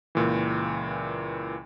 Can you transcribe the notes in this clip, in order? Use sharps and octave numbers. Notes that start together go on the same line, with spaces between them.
C#2 A#2 E3